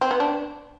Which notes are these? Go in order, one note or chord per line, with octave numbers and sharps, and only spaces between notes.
C4
B3
D4